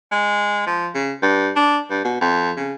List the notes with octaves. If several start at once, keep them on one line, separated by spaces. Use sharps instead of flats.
G#3
F3
C#3
G2
D4
G2
B2
F2
C#3